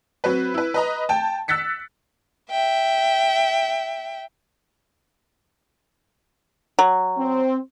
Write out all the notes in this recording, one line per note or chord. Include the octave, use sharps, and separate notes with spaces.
F#3 C4 B4
E4 B4
B4 D#5 A#5
G5 A5
E6 F#6 A6 B6 C#7
E5 G5
F#3
C4